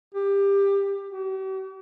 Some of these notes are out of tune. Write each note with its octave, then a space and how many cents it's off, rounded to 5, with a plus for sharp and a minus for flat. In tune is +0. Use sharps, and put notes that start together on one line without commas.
G4 +20
G4 -45